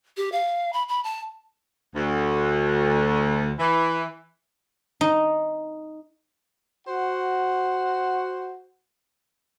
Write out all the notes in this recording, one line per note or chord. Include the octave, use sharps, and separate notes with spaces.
G4
F5
B5
B5
A5
D2
E3
D#4
F#4 C5 F#5